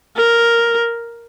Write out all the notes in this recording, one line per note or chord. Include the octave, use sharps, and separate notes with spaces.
A#4